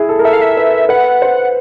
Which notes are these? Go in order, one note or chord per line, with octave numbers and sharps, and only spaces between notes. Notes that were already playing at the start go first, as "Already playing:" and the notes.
Already playing: E4 G#4
A4
A#4
A4 E5
F5
E5
B4
B4 F#5
C5